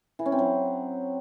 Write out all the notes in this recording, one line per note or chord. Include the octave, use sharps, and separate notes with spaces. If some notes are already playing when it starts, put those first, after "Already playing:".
E3
C#4
C4
F#3